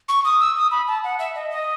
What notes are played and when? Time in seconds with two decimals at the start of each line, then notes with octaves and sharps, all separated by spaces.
0.09 C#6
0.24 D#6
0.40 E6
0.56 D#6
0.71 B5
0.87 A5
1.04 F#5
1.19 E5
1.35 D#5
1.50 D#5